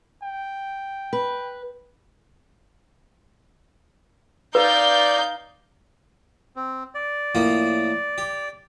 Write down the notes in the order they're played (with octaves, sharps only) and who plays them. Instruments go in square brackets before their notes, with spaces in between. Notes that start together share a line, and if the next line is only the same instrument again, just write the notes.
[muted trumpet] G5
[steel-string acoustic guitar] B4
[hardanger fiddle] D#4 F5 [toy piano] B4 [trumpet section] D5 [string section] G6
[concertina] C4
D5
[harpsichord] A2 F3 A#3
G4